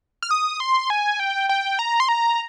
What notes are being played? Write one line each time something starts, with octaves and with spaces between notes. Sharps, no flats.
F6
D#6
C6
G#5
G5
G5
A#5
C6
A#5